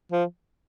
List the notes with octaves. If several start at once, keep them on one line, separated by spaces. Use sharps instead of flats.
F3